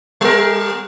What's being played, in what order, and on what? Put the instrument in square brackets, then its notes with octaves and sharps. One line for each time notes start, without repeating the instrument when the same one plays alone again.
[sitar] G3 A#4